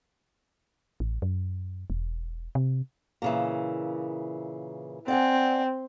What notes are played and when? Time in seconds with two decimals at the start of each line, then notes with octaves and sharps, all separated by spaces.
1.00 A1
1.22 F#2
1.90 E1
2.55 C3
3.22 A#2 C#3 E3
5.08 C4 D5 F#5 G#5